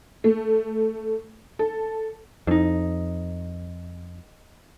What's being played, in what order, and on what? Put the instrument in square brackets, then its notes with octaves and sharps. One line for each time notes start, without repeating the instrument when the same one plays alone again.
[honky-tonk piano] A3
A4
[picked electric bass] F2 [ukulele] D4 D#4